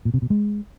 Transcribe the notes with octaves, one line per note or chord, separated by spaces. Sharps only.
A#2
C3
B2
G#3